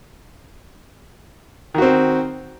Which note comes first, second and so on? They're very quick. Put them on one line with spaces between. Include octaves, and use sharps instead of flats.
D#3 F#4 C4